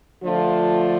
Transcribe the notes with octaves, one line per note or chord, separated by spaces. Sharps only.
D3 F3 A3 D4 F4